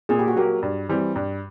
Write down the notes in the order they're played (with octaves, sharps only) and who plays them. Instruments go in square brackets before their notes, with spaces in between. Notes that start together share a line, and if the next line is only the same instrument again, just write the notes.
[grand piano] A#2 [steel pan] G#4
[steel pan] G4
F#4
[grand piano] F#3 A#3 [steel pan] G4
[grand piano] G2
E3 G3 C4
G2